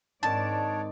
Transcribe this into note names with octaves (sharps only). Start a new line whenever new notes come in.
G#2 D#3 C4 D4 D#4 C#5 D5 A5